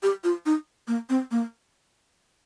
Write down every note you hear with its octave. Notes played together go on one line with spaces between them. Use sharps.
G4
F4
D#4
A#3
C4
A#3